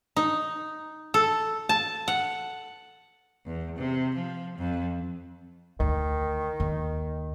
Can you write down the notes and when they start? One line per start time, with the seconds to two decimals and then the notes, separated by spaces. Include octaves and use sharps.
0.16 D#4
1.14 A4
1.69 A5
2.08 F#5
3.46 E2
3.76 C3
4.15 F3
4.58 F2
5.80 D2 D#3
6.60 D#2